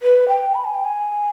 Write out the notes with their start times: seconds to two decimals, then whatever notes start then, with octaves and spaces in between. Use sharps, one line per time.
0.02 B4
0.28 G5
0.54 B5
0.65 G#5
0.74 G5
0.85 G#5